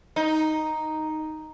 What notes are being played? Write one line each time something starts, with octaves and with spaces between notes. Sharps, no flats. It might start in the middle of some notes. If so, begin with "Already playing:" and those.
D#4